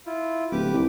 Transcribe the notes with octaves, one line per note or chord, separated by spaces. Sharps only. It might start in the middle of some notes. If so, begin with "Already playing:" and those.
E4 F4
D1 G4 B4 D6
C2